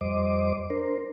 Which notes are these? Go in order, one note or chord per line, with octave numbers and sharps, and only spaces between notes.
F2 G3 C5 D#5 D6
D4 A#4 C5